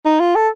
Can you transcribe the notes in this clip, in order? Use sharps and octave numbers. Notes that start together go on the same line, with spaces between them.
D#4
F4
A4